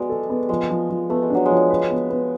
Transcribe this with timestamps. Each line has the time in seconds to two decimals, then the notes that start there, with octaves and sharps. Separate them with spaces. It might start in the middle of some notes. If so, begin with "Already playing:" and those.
Already playing: G#3 B3 F#4 D5
0.09 A4
0.29 B3
0.49 F3 G#3
0.70 F3
0.90 F3
1.10 A3 B3
1.22 G#3
1.30 F#3 D4
1.46 F3 G#3
1.70 B4
1.90 B3
2.10 B3